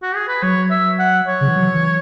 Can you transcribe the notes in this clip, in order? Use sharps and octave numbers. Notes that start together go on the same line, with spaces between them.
F#4
G#4
B4
F#3 C#5
E5
F#5
C#5
C#3
E3
F#3
E3